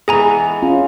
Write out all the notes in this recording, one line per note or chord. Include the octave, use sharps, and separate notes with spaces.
E3 G#3 B3 G#4 G#5 A#5
C#4 F4